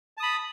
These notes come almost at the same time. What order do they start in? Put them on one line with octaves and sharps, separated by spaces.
A5 D#6 B5